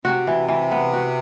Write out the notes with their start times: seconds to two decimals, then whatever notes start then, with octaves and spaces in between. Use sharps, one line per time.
0.05 C3 F#4
0.27 E3
0.48 E3
0.72 B3
0.93 F#4